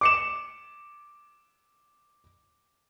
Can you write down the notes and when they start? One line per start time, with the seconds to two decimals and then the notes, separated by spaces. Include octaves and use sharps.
0.01 D6 C#7 E7